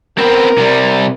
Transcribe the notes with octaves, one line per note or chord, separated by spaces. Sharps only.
B3 C4 A#4
C3 G3